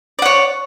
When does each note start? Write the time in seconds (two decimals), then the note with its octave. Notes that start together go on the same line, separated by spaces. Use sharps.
0.19 D5
0.22 F#5
0.26 C#5